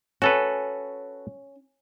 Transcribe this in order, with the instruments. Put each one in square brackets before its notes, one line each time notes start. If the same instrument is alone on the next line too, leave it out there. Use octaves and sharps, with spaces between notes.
[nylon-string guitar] C#4 [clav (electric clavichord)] F#4 A4 B4